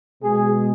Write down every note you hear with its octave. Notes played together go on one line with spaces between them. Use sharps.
B2 G#3 B3 G#4